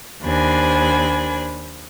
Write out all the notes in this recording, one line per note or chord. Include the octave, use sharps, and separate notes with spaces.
D#2 D4 C5 G#5 B5